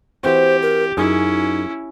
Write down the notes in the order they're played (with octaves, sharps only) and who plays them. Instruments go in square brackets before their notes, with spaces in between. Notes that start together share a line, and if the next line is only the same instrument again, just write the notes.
[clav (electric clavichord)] E3 C4 F#4 [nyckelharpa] G4 [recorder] C5
[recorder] A#4
[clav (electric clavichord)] F#2 G#4 [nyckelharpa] C#4 E4 [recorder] D#4